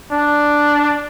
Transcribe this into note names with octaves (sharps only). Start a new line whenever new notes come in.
D4